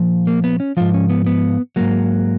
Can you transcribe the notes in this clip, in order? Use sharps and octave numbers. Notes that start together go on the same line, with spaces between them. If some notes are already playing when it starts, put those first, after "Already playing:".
Already playing: A#2 F3
A#3
B3
C#4
G#2 F3 F4
C#4
B3
B3
G#2 F#3 A#3